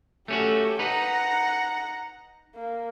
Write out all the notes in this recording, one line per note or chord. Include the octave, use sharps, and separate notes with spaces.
A3 C#4 F#4 G4 A4
D#4 B4 F#5 A#5
A#3